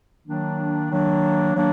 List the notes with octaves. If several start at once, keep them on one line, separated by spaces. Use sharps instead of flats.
D#3 F#3 A#3 D4
D#3 F#3 A#3 D4
D#3 F#3 A#3 D4